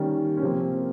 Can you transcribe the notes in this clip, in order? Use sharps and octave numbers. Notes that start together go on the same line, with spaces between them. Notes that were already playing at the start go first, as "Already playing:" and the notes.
Already playing: D#3 G3 A#3 C#4
C#4
C3 F3 A#3 C4